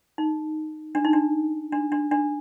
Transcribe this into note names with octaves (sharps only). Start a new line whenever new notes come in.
D#4
D4
D#4
D4
D4
D4
D4